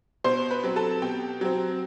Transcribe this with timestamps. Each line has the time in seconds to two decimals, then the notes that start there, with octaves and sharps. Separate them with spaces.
0.24 B2 C5 C6
0.51 B4 B5
0.64 F#3 C4
0.76 A4 A5
1.02 B2 G4 G5
1.41 F#3 C4